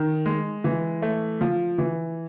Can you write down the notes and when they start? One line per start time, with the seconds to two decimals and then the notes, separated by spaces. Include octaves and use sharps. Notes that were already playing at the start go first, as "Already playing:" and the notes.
Already playing: D#3
0.26 G#3
0.64 E3
1.02 A3
1.41 F3
1.78 E3